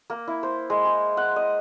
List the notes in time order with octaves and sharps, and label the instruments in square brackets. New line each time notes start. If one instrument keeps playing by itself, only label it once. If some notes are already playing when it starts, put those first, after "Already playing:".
[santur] A#3
E4
C5
G#3
G#4
F#5
D#5